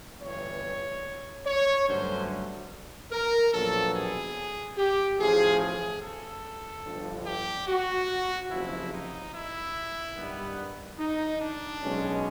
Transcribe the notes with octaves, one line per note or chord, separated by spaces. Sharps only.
G1 G2 E3 C#5
C#5
G2 D3 F#3 A3 C#4 C5
A#4
A#1 A#2 F#3 B3 A4
G#4
G4
A1 A2 F3 G#4
G#4
A4
G1 G2 D3 F3
G4
F#4
F#1 E2 C3 F3 G#3 E4
D#4
E4
G2 D#3 G3 B3
D#4
D4
B1 B2 G#3 C#4